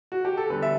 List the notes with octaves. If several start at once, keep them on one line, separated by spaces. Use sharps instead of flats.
F#4
G4
A4
E2 D3 G3 B4
E5